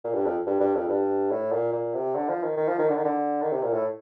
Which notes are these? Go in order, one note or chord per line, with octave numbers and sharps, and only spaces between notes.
A#2
G2
F2
G2
G2
F2
G2
A2
A#2
A#2
C3
D3
F3
D#3
D#3
F3
D#3
D3
D#3
D3
D#3
C3
A#2
A2